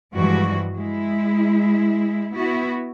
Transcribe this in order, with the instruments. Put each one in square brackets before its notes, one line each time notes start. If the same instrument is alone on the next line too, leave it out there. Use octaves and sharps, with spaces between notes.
[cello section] G2 E3 F3 G3 G#3 F#4
G#3 E4
B3 E4 F#4